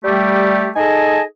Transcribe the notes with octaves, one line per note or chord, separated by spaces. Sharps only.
G3 A3 G4
D#4 G#4 A4 D#5 G#5 A5